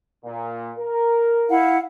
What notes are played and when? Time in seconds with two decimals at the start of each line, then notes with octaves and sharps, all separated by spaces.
0.24 A#2
0.79 A#4
1.49 E4 F5 F#5